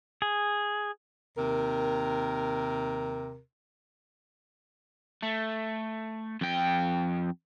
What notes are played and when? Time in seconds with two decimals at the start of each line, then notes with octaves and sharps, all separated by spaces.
0.22 G#4
1.38 D#2 C3 A#4
5.22 A3
6.41 F2 G5